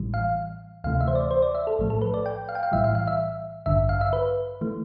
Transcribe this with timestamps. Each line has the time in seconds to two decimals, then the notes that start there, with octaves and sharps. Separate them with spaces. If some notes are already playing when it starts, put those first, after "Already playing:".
Already playing: A1 A2 E3 G3
0.14 F5
0.84 D2 C3 E3 A3 F5
1.01 E5
1.08 C5
1.15 D5
1.31 C5
1.42 D5
1.55 E5
1.67 A4
1.79 B1 A2 F3 A3
1.90 A4
2.02 B4
2.14 D5
2.26 G5
2.49 F5
2.55 G5
2.63 F5
2.72 B1 A2 E3 G3 E5
2.84 F5
2.95 F5
3.07 E5
3.66 A1 G2 D3 E5
3.89 F5
4.01 E5
4.13 B4
4.61 E3 A3